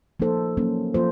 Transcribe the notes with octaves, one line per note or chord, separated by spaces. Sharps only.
F3 A#3 D#4 A4 C5
F#3 A#3 C#4 A4
F3 A#3 F4 A4 C5